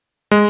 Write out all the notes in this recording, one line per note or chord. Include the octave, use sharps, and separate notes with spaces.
G#3